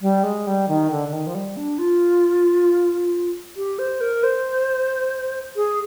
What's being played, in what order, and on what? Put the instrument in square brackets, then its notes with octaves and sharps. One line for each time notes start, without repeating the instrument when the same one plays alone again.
[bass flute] G3
G#3
G3
D#3
D3
D3
D#3
F3
G3
D4
F4
G4
C5
A#4
C5
G#4